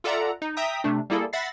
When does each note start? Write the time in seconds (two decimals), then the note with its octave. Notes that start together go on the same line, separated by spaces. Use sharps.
0.04 F4 A4 D5 E5 F#5 A#5
0.42 D#4
0.57 E5 G5 A#5 D#6 B6
0.84 C3 A3 D4
1.10 G3 A#3 E4 G#4 A4
1.33 E5 F#5 B5 A6 A#6 C7